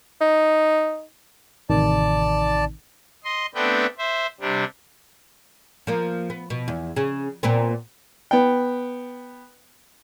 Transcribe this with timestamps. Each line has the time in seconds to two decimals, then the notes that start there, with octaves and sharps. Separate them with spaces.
0.21 D#4
1.70 A1 C3 D#3 D5 A5
3.24 D#5 C6
3.55 A3 B3 C4 D4 B4 G5
3.98 C5 E5
4.40 C3 G3 D4
5.87 F3 A#3
6.30 B3
6.50 B2
6.68 E2
6.96 C#3
7.43 A#2 B3 C4
8.31 B3 G5